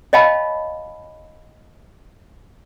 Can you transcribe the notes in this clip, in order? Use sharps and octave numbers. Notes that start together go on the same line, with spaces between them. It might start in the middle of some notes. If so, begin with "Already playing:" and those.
C#5 D#5 F5 G5 A5 B5